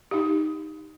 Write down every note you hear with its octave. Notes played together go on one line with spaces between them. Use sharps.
D#4 G4